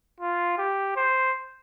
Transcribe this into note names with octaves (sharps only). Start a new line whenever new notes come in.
F4
G4
C5